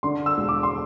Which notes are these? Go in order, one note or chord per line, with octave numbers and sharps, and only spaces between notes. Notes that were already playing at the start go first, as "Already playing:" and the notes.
D3 C6
E6
E1
D6
C6